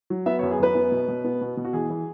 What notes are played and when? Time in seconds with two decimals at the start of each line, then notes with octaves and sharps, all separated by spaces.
0.10 F#3
0.26 B3 E5
0.39 C#5
0.43 F#2
0.51 G#4
0.59 F#2 B4
0.75 B3
0.92 B2
1.08 B2
1.24 B3
1.41 B2
1.57 B2
1.65 F#4
1.73 E3 G#4
1.90 E3